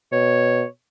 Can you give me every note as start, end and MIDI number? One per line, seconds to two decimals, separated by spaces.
0.12 0.64 47
0.12 0.66 73